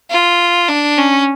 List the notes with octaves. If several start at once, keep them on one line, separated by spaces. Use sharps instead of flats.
F4
D4
C#4